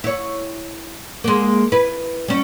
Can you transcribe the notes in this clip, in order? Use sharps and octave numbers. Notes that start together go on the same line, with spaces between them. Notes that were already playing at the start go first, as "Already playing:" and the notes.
E4 C#5
G#3 A#3
E4 B4
G3 C#4